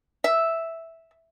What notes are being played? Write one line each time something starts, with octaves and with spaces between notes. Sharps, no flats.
E5